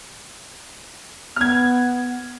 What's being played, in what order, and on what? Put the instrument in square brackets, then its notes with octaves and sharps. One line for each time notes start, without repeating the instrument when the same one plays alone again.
[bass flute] B3 [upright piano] F6 G#6